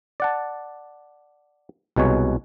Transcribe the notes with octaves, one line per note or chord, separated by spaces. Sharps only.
D5 F#5 A5
C2 B2 G#3 C#5